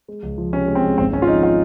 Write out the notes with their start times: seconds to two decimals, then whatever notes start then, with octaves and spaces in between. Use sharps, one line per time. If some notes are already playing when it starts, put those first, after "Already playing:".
0.08 G#3
0.23 C#2
0.38 F3
0.53 C3 C#4
0.68 G#3
0.75 C4
0.83 C#2
0.98 G#1 C4
1.13 G#1 C#4
1.22 F4
1.27 F3 D#4
1.43 F4